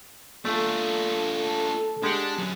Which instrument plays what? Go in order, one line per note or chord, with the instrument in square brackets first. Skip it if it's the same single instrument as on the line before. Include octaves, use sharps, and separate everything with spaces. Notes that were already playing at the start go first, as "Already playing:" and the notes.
[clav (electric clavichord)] A3 D5 [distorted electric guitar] D4 F4 [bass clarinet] A4
[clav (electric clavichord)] G#3 G4 F#5 [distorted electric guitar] D4
[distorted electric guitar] F#2 F#3